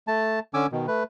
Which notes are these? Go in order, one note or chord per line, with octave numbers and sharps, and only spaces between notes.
A3 A5
D3 C#4 G#5 D6 E6
B2 D#3
A3 B4